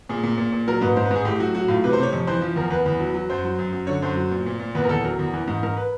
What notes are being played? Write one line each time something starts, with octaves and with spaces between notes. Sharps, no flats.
A#2 G#4
A#2
A#2
A#2
F#3 A#4
G#2 B4
G#2 C5
B4
G#2 G#4
A2 G4
F#3 F#4
F#3 F#4
A2 F4
C3 B4
C5
C3 C#5
F2 C#5
E3 C5
F3
E2 A#4
E2 B4
E2
F#3
F#3
F#2 C5
F#3
F#2
F#2
D3 C#5
F#2 C5
F#3
A#2
A#2
A#2
E2 B4
A#4
E2 A4
F#3 A#4
E2
E3
G#2
G#2 A#4
B4